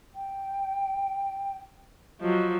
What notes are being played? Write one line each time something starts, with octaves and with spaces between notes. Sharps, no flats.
G5
F3 F#3 D#5